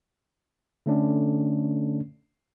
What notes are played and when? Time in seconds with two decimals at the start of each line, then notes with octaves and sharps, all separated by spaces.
0.86 D3 A3 C#4 D4